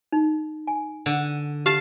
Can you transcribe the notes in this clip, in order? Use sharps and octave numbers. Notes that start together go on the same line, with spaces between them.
D#4
G#5
D3
G4 F5 A5